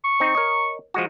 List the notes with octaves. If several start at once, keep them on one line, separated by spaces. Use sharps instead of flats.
C#6
C4 D#4
A#4 C#5 D#5
F3 G#3 F#4